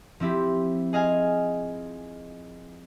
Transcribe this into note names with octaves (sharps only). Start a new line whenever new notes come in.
F3 C4 E4 G4
G#4 D#5 F5 G#5